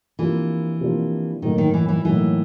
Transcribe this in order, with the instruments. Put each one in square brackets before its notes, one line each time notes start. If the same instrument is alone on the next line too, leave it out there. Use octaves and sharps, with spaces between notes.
[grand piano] C3 F3 A#3 D4 F4 [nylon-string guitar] E3
[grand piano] C3 F3 A#3 D4 F4
[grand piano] A2 F#3 A#3 D#4 [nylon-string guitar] D#3
[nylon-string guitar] D#3
E3
E3
[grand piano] A2 F#3 A#3 D#4 [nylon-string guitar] E3